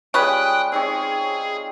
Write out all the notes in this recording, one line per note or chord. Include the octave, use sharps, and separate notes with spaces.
G3 G#3 C#4 F4 B4 G5 D#6 F#6
C4 D#4 G#4 C#5